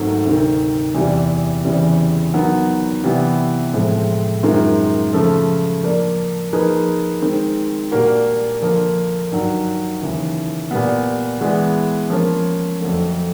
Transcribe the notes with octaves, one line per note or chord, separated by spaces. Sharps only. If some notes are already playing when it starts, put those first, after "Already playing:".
Already playing: G#2 D#3 F#3 A3 C4
D2 C3 D#3
E2 C3 E3 G3
E2 C#3 E3 G3 C4
D#3 F#3 B3
C3 E3 G3 B3 D4
A2 F3 G#3 C4
F#2 D#3 G#3 C4 F4
C#3 F3 A3
F3 A#3 D4
F3 A#3 D#4 G#4 B4
D#3 G#3 C4
A#2 G3 A#3 D4 F#4
D3 F3 A#3
G2 D#3 F#3
D#2 C#3 E3
A#2 G3 B3
E3 G#3 B3 D4
F3 A#3 C#4
F2 D3 F#3 A3